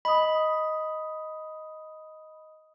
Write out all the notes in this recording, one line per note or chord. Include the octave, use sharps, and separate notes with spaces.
D#5 B5 D#6